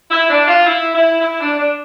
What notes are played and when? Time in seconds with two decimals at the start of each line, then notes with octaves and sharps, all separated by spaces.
0.11 E4
0.29 D4
0.48 F4
0.66 E4
0.93 E4
1.21 E4
1.40 D4
1.57 D4